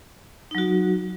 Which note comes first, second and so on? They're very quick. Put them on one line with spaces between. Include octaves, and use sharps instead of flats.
D#4 F#3 F#4